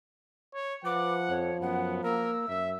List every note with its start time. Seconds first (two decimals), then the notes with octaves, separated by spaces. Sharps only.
0.55 C#5
0.85 F3 B4 F#5 D6
1.29 F2 C#5
1.61 F#2 B3 F#5
2.03 A#3 A#4 E6
2.49 F#2 E5